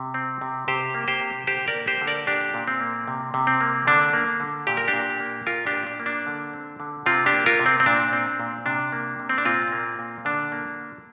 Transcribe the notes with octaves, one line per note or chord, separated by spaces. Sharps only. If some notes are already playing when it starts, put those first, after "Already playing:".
Already playing: C3
C4
C3
C3 G4 C5
A#3
G4 C5
C3
D3 G4 C5
A#4 D5
A#3
G4 C5
D3
A#4 D5
A#2 D4 G4
A#2
C4
A#3
C3
C3
C4
A#3
D3 D4
A#3
D3
A#2 G4
A#4
D4 G4
A#2
A#3
A#2 F4 A#4
D4 G4
A#2
D4
A#3
D4
D3
C4
D3
C3 C4 F4
D4 G4
A#3
F4 A#4
C3
C4
C4
A#2 D4
C4
A#2
C3 D4
A#3
C3
C4
D4
A#2 C4 F4
A#3
A#2
D3 D4
A#3